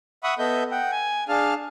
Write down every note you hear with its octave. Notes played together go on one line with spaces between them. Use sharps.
E5 F#5 B5 C#6 D#6
B3 A4 D#5 E5 G6
F#5 G5
G#5
D4 G#4 F5 A5 F6